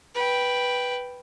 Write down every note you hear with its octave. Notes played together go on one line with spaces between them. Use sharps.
B4 G5